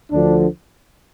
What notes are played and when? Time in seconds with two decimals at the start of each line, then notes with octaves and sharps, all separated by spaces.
0.11 D2 D3 F3 D4